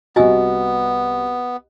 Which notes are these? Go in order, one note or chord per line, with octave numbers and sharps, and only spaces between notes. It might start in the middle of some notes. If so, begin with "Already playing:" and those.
C2 B3 F#4 D#5 G#5 E6